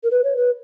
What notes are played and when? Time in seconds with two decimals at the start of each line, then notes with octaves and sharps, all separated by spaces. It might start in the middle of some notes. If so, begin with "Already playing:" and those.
0.04 A#4
0.11 B4
0.24 C#5
0.37 B4